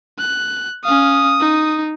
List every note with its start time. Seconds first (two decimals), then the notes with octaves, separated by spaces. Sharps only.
0.19 F#6
0.84 C#4 F5 D#6
1.40 D#4